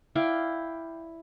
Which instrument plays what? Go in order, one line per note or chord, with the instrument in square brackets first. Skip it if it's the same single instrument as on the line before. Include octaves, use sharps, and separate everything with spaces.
[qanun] E4 D5 F5 G5